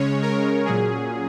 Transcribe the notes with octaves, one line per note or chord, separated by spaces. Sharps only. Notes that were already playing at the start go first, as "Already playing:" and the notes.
Already playing: C#3 G#3 C#4 C#5
A#4
A#2 F#3 C#4 G#4